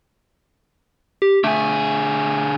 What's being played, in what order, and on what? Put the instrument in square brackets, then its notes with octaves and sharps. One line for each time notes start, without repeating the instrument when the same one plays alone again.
[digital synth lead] G4
[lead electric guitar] D3 G#4 [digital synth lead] A3